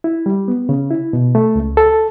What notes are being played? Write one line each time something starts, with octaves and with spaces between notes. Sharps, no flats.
E4
G3
B3
C#3
E4
B2
A3
C#2
A4